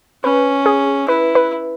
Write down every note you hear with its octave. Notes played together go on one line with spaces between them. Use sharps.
C#4 B4
G#4
E4 B4
B4